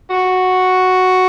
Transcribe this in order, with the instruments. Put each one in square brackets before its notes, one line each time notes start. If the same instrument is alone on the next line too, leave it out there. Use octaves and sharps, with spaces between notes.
[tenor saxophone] F#4